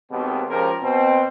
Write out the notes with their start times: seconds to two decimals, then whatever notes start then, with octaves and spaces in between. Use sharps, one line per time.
0.11 G#1 D#2 B2 B3 C4 G4
0.49 C#2 C#3 F3 G4 A#4
0.82 B2 C4